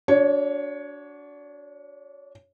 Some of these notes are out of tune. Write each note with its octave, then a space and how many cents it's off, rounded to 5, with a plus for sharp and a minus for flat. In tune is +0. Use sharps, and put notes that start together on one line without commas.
D4 -25 F#4 +0 C#5 +0